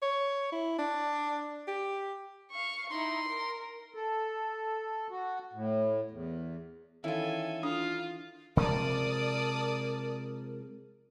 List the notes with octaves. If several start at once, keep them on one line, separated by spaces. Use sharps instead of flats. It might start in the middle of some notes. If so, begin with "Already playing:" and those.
C#5
E4
D4
G4
F5 C#6
D#4 E4 C6
A#4
A4
F#4
A2
E2
D#3 E3 C#4 E4 F4 A4 G#5
D4 F4 D#6
C3 F3 G#3 A#4 D5 A5 D#6